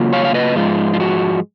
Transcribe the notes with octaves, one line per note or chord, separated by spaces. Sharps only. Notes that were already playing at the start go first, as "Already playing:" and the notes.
Already playing: C#3 F#3 A#3 F4
C#5 F5
F5
B4 D#5
G#2 F3 G#3 F4
F4
F#4